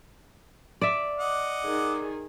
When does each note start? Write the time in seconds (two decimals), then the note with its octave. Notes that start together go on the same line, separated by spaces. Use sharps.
0.82 D5 E5
1.19 D#5 F#5 D6
1.63 D#3 G#4